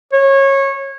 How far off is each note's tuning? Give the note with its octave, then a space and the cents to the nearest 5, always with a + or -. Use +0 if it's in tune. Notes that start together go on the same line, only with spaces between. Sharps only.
C#5 -20